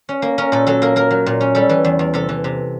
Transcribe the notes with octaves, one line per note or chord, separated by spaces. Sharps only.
C#4
A#3
C#4 A#4
A#2 A4
F#3 A4
A#3 A#4
A#3 A#4
F#3
A#2
C#4
G3 A4
E3
E2
E2
C3 A4
E3
C3